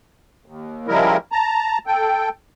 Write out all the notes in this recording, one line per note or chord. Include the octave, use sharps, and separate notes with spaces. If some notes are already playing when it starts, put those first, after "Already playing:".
D#2
C#3 F3 G3 G#3 E4 A#4
A5 A#5
A4 G5